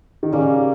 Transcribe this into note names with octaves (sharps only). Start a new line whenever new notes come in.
D#3
C#3 G3 A#3 C#4